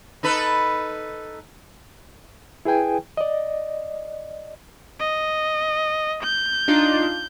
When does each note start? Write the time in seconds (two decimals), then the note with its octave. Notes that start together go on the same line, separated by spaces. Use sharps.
0.23 D#4 A4 B4
2.65 E4 G#4 B4 G5 G#5
3.17 D5 D#5
5.00 D#5
6.23 G6
6.68 D4 D#4 F4